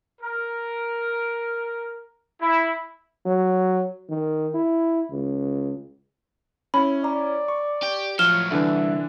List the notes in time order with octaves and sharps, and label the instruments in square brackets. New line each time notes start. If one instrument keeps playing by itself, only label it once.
[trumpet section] A#4
E4
[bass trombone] F#3
D#3
E4
C#2
[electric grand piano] C#4 E4 [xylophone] B5
[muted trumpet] D5 [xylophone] A#5
[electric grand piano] C#6
[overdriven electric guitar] G4
[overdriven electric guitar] A2 F#3 [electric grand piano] F3 [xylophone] F6 E7 G7
[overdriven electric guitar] C2 [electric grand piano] D3 E3 D4 [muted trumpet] E5